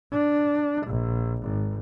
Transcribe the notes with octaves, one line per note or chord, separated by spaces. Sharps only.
D4
A#1
G#1